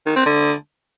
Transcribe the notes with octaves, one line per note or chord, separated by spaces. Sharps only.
D#3
C4
D3